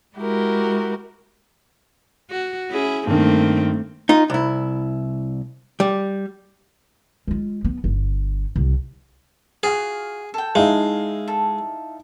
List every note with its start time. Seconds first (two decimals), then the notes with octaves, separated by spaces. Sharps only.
0.17 G#3 E4 F#4 G4 A#4
2.30 F#4
2.70 C#4 E4 G#4
3.07 G2 D#3 A3 A#3 C4
4.09 D#4 F4
4.30 C2 E4
5.80 G3
7.27 G#3 F4
7.65 B3
7.84 G1
8.56 C2
9.63 F4 F#4 G#4 F5
10.34 A4 G5
10.55 G#3 D#4 E4 F5
11.28 A4